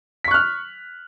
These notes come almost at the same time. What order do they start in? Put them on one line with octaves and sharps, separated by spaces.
B6 C#6 F#6 F6